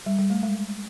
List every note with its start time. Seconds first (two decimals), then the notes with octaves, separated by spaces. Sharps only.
0.06 G3
0.18 G3
0.30 A3
0.43 G#3